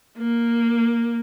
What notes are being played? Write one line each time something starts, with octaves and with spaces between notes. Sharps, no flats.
A#3